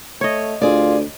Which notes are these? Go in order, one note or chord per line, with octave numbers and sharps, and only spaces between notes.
A3 C#5 D#5
D2 F4 G#4 D5